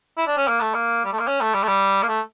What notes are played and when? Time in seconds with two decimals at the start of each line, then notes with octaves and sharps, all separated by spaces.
0.17 E4
0.27 D4
0.37 C#4
0.48 A#3
0.61 A3
0.74 A#3
1.05 G3
1.13 A3
1.20 A#3
1.27 C#4
1.41 A3
1.54 G3
1.63 A3
1.68 G3
2.03 A#3
2.08 A3